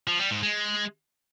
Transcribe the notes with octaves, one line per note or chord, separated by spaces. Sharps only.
F3
G3
G#2
G#3